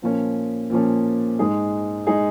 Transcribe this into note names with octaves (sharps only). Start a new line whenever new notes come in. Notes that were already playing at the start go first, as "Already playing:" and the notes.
A#2 F3 A#3 C#4
A#2 F3 A#3 C#4
G#2 G#3 D#4 G#4
G#3 D#4 G#4